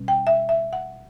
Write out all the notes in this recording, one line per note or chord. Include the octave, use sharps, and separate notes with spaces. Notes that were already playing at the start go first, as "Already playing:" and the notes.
Already playing: B2 G3 C#4
G5
E5
E5
F#5